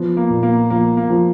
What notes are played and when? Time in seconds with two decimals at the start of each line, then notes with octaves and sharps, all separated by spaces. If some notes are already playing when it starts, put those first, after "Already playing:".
Already playing: F3 B3
0.17 A#3
0.30 A#2
0.43 A#3
0.70 F3 A#3
0.97 A#3
1.10 F3